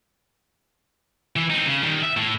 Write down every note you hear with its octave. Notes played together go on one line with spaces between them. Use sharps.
E3
C4 D#4
C#3
D#3 G3
E5
A2